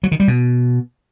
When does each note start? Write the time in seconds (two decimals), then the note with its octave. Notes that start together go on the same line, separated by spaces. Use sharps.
0.03 F#3
0.12 D#3
0.20 G3
0.28 B2